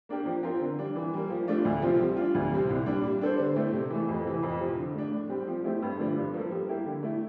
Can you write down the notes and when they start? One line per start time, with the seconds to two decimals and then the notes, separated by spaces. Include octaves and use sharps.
0.09 A#3 D4 G4 A#4
0.26 F3
0.43 C4 F4 A#4
0.61 D3
0.79 G3 D4
0.96 E3
1.14 G3 A#3
1.30 F3
1.47 A3 D4 F4
1.65 D2
1.82 C3 F3 C4 F4
2.00 G3
2.17 D4 F4
2.35 D2
2.52 C3 G3 C4
2.70 C2
2.86 A#2 G3 D4
3.04 G3
3.21 D4 A4 C5
3.39 D3
3.56 A3 C4 E4
3.73 C3
3.90 E3
3.95 A3
4.08 F2
4.25 C3 E3
4.43 F2
4.60 C3 F3
4.77 D3
4.95 A3 D4
5.12 A2
5.29 G3 C4 G4
5.47 F3
5.64 A3 C4 E4 G4
5.82 G2
5.98 D3 F3 A3 D4
6.16 G2
6.34 F3 A#3 F4 A4
6.51 G3
6.68 A#3 E4 G4
6.86 D3
7.03 A3 E4